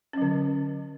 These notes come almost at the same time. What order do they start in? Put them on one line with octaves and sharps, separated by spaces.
C#4 F#3 D3